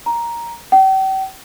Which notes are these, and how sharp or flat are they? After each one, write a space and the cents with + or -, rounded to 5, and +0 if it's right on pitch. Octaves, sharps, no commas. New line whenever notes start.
A#5 +5
G5 -40